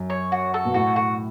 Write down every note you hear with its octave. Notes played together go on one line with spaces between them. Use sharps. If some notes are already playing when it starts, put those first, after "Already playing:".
Already playing: F#2
C#5
F#4
A4
B2
A2 F#4
F#4